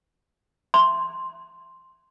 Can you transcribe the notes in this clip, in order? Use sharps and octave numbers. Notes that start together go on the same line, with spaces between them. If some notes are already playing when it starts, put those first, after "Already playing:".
C6